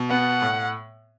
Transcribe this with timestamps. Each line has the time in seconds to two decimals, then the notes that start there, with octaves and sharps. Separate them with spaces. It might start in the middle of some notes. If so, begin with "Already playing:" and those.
Already playing: B2
0.10 B3 F#5
0.42 A2